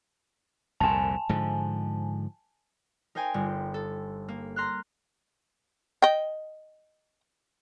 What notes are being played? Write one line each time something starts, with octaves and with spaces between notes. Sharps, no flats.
C2 F2 A#2 G#5 A5
G#2 D3 F3
D#4 A#4 C5 G5 G#5
G1
A4
A#3
A#5 C6 F6 F#6
D#5 G5